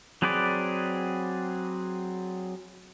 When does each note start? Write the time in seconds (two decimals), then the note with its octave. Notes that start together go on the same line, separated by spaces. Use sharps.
0.22 F#3 C4 G#4 B4 D5